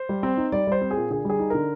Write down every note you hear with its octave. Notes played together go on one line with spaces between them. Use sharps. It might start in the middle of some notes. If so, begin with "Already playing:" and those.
Already playing: C5
G3
C4
D#4
G3 D5
G3 C5
C4
G#4
A#2
D3 G#4
G3 G#4
D#4
D3 A#4